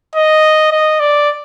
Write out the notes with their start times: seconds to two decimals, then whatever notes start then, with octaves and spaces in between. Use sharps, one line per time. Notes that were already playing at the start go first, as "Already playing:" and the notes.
0.15 D#5
0.72 D#5
1.00 D5